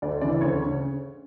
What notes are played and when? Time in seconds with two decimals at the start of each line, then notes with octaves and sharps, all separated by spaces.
0.02 D2 D5
0.21 C#3 E3 D5
0.41 D2 C#5
0.60 C#3